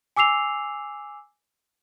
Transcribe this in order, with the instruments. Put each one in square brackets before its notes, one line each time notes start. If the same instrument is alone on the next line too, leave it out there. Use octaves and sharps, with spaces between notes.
[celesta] G#5 D6 E6 C7 F7